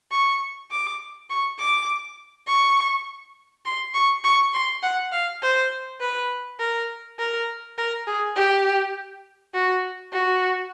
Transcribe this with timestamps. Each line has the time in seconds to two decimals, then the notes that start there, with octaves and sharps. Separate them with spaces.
0.12 C#6
0.71 D6
1.30 C#6
1.59 D6
2.48 C#6
3.65 C6
3.94 C#6
4.24 C#6
4.54 C6
4.83 F#5
5.12 F5
5.42 C5
6.00 B4
6.60 A#4
7.19 A#4
7.78 A#4
8.07 G#4
8.36 G4
9.54 F#4
10.13 F#4